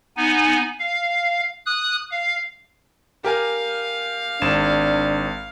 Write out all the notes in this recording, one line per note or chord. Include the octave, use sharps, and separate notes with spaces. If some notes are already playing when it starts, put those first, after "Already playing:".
B3 D#4 G#5
F5
D#6 F#6
F5
G4 A#4 F5 G#5
G#1 D4 E7